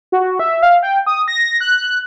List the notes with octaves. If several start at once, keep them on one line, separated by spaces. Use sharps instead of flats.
F#4
E5
F5
G5
D#6
A#6
F#6